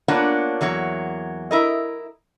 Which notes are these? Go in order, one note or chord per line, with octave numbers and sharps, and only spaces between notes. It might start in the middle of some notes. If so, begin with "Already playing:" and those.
A#3 B3 D4 F4 C#5 F#5
E2 F#3 A#3 C#5
E4 A#4 D#5